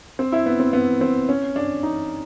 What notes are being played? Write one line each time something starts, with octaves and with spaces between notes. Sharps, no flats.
C4
E4
B3
C4
B3
C4
C#4
D4
D#4